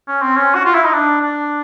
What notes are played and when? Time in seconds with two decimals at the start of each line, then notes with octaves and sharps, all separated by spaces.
0.08 C#4
0.22 C4
0.37 C#4
0.55 F#4
0.65 F4
0.75 E4
0.84 D#4
0.93 D4
1.21 D4